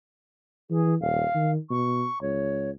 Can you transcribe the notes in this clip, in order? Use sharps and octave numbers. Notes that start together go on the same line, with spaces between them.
E3 G#4
D#1 F5
D#3
B2 C#6
C#2 C#5